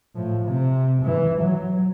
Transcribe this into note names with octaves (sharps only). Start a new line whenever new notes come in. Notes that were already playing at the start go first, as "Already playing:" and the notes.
A2 F3
C3
G#2 E3
F#3